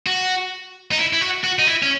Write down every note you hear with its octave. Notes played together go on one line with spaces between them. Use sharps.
F#4
D#4
E4
E4
F#4
F#4
D#4
E4
C#4